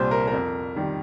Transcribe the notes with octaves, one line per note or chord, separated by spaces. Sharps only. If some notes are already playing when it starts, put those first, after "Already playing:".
Already playing: C2 A#2 G3 C5
A#4
A#4
F2
D#3 G3